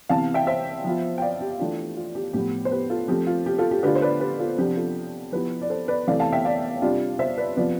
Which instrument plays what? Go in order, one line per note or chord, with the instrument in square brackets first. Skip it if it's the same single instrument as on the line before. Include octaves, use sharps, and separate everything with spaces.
[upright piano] C3 E3 B3 F5 A5
E5 G5
C5 E5
F3 B3 F4
G5
D5 F5
G4
E3 A3 D4 F4
F4
G4
A2 F3 B3 G4
C5
G4 B4
F4 A4
F3 A3 C4 G4
F4
G4
F4 A4
G4
D3 A3 D4 F4 G4 B4
C5
B4 D5
G4 B4
F4 A4
C3 F3 B3 D4 G4
F4 A4
F3 B3 E4 G4 B4
D5
A4 C5
B4 D5
C3 E3 A3 D5 F5
F5 A5
E5 G5
D5 F5
C3 G3 D4 F4
C5 E5
B4 D5
C3 F3 B3 F4 B4 D5